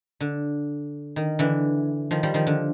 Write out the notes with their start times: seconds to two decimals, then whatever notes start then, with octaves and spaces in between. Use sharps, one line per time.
0.20 D3
1.16 D#3
1.39 D3 E3
2.11 D#3 F3
2.23 F3 G3
2.34 D#3 F3
2.47 D3